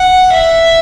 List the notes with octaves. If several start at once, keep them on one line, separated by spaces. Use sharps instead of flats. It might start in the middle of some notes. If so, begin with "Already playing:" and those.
Already playing: F#5
E5